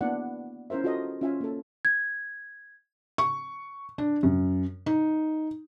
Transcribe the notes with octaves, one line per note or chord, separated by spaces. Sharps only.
A#3 B3 D4 E4 D5 F#5
C#4 E4 A#4 C5 E5
F4 F#4 A4 A#4 D#5
C#4 F4 E5 F5 G#5
A#3 A4
G#6
C#6
D4
F#2
D#4